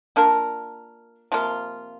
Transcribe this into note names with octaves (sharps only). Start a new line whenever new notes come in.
A#3 D4 F4 A#4
C3 F3 A#3 F4